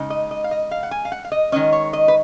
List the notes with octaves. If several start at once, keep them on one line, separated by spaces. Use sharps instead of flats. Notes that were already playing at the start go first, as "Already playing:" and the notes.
Already playing: C#3 G#3 D#4
D#5
D#5
F5
D#5
F5
F#5
G#5
F5
F#5
F5
D#5
D#3 G#3 C#4 D#5
C#5
D#5
B4